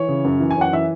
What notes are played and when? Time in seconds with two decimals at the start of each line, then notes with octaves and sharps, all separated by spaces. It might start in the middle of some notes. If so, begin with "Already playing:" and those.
Already playing: E3 C#5
0.08 C#3
0.25 F#2
0.40 E3
0.51 G#5
0.57 F#2 F#5
0.73 E3 E5